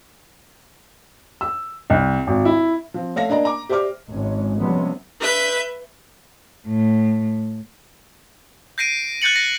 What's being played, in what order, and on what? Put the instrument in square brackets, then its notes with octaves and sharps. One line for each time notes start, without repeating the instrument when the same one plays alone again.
[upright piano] E6
C2
G#1
E4
[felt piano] F3 C4
A3 C#5 E5 F5 A#6
A#3 D4 D5 D#5 A#5
A#5 D6
G4 C5 D5 E5 D6 F6
[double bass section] G#1 G#3 C#4
C3 F3 G3 G#3 B3 C#4
[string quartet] B4 E5 G6
A2
[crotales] G6 A#6 C7 D7 D#7
F#6 G6 A6 C#7 F#7
A#6